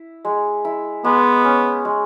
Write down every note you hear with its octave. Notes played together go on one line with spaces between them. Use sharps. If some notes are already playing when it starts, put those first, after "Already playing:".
Already playing: E4
G#3
E4
G#3 B3
C#4
G#3